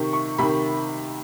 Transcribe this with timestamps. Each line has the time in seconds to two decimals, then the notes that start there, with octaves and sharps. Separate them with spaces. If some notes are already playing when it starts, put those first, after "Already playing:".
Already playing: C3 D#3 C#6
0.13 C#6
0.38 C3 D#3 B5